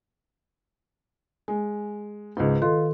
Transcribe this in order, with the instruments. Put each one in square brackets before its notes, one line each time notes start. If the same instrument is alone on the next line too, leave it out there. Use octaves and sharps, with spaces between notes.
[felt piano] G#3 [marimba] G#5
[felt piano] C#2 G#2 [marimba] F4 B4 D#5
[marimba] D#3 A4 C6 [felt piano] F4